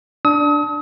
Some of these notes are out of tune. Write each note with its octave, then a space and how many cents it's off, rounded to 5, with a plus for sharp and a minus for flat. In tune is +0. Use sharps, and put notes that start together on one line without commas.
D4 +0 D#6 +40